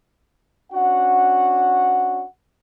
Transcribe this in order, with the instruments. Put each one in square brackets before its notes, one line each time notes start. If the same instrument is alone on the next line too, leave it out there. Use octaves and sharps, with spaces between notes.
[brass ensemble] C#4 D4 F#4 F#5